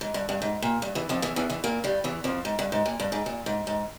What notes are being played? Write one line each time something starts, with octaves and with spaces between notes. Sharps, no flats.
G#2
G2
G2
G#2
A#2
G2
E2 E3
F2 F3
E2 E3
E2 E3
E2 E3
A#2 A#3
G2 G3
E2 E3
F2 F3
G#2
G2
G#2
A#2
G2
G#2
A#2
G#2
G#2